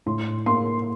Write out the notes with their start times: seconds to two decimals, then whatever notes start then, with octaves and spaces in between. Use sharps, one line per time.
0.06 A2 C6
0.46 A#3 C6